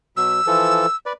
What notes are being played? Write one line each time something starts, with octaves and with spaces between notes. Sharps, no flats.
B2 F#3 E6
E3 F3 A4
B4 D5